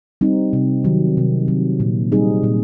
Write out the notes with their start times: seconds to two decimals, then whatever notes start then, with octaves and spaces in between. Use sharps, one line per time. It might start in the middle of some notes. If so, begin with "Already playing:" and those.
0.21 G3 C4 D#4
0.53 C3
0.84 D#3 F#3
1.17 C3
1.48 D#3 F#3
1.80 A#2
2.12 G3 C4 D#4 G#4
2.43 A#2